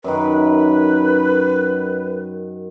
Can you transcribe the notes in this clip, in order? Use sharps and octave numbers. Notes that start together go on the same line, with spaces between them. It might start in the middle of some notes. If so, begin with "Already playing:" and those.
F#2 D#3 B4